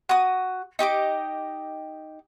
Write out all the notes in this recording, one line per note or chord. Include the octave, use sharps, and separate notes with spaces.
F#4 D#6
D#4 G4 D#5 D6